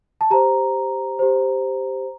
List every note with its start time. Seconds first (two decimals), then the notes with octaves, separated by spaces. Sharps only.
0.21 A5
0.30 G4 C5 A#5
1.19 G4 C5